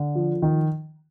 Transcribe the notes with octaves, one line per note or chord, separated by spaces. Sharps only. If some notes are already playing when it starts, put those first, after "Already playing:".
Already playing: D3
F3
D#3